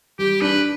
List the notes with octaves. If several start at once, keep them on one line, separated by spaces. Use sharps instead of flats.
G3 G4
D4 B4